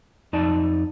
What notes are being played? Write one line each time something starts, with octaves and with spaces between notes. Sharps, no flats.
F2 D#4 D5 A5